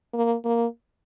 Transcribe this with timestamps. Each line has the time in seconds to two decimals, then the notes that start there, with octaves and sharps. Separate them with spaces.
0.14 A#3
0.45 A#3